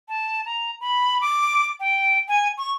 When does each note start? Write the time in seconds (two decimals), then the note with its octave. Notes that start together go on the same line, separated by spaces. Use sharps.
0.09 A5
0.46 A#5
0.81 B5
1.21 D6
1.80 G5
2.28 G#5
2.58 C#6